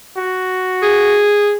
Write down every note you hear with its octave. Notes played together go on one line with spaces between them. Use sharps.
F#4
G#4